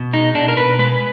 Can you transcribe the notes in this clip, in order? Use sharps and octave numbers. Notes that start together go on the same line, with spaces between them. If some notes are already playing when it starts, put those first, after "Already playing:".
Already playing: B2
G#3 D#4
B2 D4
A#4
B2 B4
G#3 B4